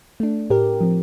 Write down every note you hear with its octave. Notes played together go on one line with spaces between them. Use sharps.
A3 D4
A2 G4 A#4
F3 C4